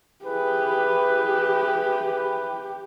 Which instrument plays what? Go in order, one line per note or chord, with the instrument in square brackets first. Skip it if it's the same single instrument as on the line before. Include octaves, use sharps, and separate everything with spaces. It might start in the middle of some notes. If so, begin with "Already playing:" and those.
[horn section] E4 G#4 B4 [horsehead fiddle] G4